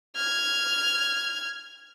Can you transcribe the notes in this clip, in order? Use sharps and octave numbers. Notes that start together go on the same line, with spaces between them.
F6 G#6